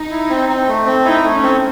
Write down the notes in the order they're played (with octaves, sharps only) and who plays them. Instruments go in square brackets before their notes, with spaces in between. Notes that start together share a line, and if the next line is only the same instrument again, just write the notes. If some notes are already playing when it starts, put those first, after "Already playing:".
Already playing: [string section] D#4
[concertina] E4
C4
C4
A3
C4
[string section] D#4 [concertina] E4
[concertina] A3
[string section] C#4
[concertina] C4